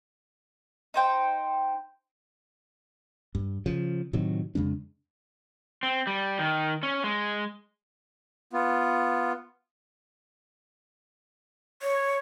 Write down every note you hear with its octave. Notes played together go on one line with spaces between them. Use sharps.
D#4 C5 G5
G2
C#3 F3
A2 C3 D#3 F#3
F2 C#3 G#3 D4
C4
G3
D#3
C#4
G#3
B3 F4
C#5